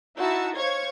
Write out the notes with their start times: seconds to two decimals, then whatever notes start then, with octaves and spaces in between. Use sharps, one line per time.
0.17 D#4 E4 F#4 E5 A5 E6
0.56 C5 C#5 F5 C#6 G#6